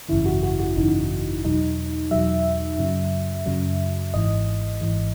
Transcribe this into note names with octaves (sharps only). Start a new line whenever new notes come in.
G#1 F#2 C#3 E3 E4
F#4
F#4
F#4
G#1 F#2 C#3 E3 D#4
E2 B2 F#3 D#4
E2 B2 F#3 E5
F#2 C#3 F#3
F#2 C#3 F#3
G#1 G#2 E3 D#5
G#1 G#2 E3